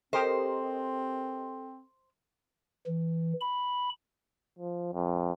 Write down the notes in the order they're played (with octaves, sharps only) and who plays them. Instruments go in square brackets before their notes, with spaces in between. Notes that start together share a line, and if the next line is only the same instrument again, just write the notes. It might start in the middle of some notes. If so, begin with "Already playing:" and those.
[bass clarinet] C4 [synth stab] G4 A#4 D#5 [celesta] A4 [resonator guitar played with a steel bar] C5
[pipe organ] E3
B5
[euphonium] F3
F2